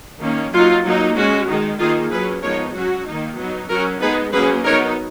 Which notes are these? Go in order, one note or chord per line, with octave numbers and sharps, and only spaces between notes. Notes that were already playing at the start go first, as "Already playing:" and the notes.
D#3 A#3 C#4
F#3 A#3 D#4 F4
F#3 A#3 D#4
G#3 C#4 F#4
D#3 G#3 D#4
D#3 A#3 D#4 F4 G#4
F#3 C#4 G#4 B4
F3 G#3 B3 D#4 A#4 C#5
F#3 C#4 F#4
D#3 A#3 D#4
F#3 B3 D#4
F#3 C#4 F#4 A#4
G#3 B3 D#4 G#4 B4
F#3 A#3 C#4 G#4 B4
F#3 B3 D#4 A#4 C#5